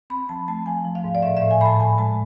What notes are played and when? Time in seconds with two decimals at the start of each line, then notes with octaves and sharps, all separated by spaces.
0.10 C4 B5
0.29 F3 A5
0.48 A3 A5
0.66 F3 G#5
0.85 F3
0.95 F5
1.04 G#2
1.15 D5
1.22 A2 E5
1.37 A2 E5
1.51 G#5
1.61 A2 A5 B5
1.80 A2 G#5
1.98 G#3 A5